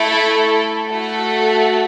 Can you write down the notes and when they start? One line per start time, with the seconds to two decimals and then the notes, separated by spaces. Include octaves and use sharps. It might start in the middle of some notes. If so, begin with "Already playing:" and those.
Already playing: A3 E4 A4
0.88 A3 F#4 A4